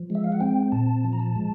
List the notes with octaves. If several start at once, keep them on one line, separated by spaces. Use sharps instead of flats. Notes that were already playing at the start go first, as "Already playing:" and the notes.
Already playing: F3
G#3
E5
F5
F#5
C4 G5
A#2 A5
F3
A#5
A5
G#3